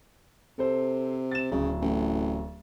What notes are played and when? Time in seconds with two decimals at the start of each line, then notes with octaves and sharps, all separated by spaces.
0.58 C3 A4 C5
1.31 A6 E7
1.52 D1 C#3
1.82 A1